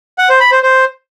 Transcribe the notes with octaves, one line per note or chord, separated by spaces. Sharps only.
F#5
C5
B5
C5
C5